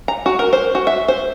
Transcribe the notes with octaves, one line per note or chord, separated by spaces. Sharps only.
A#5
F#4
A#4
C5
F#4
E5
C5